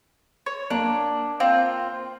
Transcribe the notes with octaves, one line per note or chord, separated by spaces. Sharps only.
C#5
A#3 D4
C4 F4